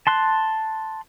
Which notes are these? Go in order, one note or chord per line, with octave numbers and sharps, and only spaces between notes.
A5 C6 F#6